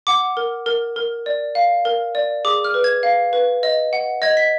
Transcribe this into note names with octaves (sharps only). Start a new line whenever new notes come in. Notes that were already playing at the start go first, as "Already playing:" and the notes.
F#5 D6
A#4
A#4
A#4
D5
F5
A#4
D5
G#4 D6
F6
B4
G#6
F5
B4
D#5
F#5
D#5 G#6
B6